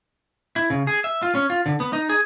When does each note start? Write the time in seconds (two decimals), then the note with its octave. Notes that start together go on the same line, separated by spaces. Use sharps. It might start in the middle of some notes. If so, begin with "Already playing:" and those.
0.56 E4
0.70 C#3
0.87 G#4
1.04 E5
1.23 F4
1.35 C#4
1.50 F4
1.66 D3
1.80 B3
1.93 D#4
2.09 G#4